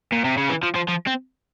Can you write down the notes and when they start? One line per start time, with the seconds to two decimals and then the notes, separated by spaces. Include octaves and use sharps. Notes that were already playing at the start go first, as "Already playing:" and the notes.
0.13 A#2
0.25 C3
0.38 C#3
0.49 E3
0.63 F3
0.76 F3
0.89 F3
1.07 C4